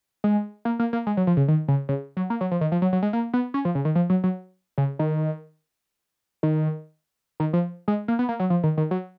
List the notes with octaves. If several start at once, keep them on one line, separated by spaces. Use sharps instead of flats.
G#3
A#3
A#3
A#3
G#3
F#3
F3
C#3
D#3
C#3
C#3
F#3
A#3
F#3
F3
D#3
F3
F#3
F#3
G#3
A#3
B3
C#4
F3
C#3
D#3
F3
F#3
F#3
C#3
D#3
D#3
D#3
F3
G#3
A#3
B3
A#3
F#3
F3
D#3
D#3
F#3